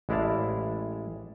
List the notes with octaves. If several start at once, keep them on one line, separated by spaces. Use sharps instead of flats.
A1 G#3 E4 D5 F5 A5